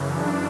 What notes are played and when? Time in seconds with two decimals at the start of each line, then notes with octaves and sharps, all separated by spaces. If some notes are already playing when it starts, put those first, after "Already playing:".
Already playing: F#2 C#3 E3
0.09 D4